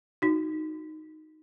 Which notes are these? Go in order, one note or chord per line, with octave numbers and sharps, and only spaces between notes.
D#4 F#4